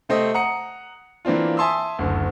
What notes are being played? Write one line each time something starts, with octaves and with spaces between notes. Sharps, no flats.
C3 A3 C4 D#5
F#5 A#5 D#6 C#7
E3 A#3 C4 D4 F4
E5 G#5 A5 C6 D#6 E6
F#1 D2